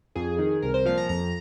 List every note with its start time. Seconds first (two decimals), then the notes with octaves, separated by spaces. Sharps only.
0.16 F2 G#4
0.39 D#3
0.62 C2 A#4
0.74 C5
0.85 A#2 F3 F5
0.98 A#5
1.09 F2 A#5